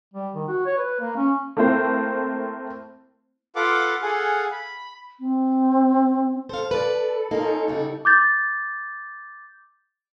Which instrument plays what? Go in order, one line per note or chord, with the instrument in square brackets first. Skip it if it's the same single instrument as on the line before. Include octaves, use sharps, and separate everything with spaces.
[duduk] G3
D#3
F#4
C#5
B4
A#3
C#4
[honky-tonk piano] A3 A#3 C4 E4 C5
[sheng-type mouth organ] F4 A4 B4 F5 F#5 D6
G#4 A4 F5 F#5 G#5
B5
[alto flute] C4
[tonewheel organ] A4 [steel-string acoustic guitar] C5 F5
[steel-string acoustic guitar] B4 D5
[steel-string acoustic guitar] A#3 C#4 F4 [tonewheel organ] D#4 A4
[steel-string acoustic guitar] C#3 G3 F#4
[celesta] D6 G6 A6